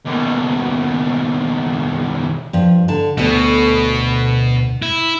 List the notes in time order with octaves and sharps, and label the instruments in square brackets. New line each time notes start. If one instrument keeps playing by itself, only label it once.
[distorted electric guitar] D#2 B2
[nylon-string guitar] G2 F3
D3 A5
[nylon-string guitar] D2 A4 [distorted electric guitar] B2
[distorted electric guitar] E4